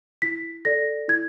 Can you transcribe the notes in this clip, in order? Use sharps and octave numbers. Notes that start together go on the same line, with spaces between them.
E4 B6
A4 D5 A#6
E4 G#6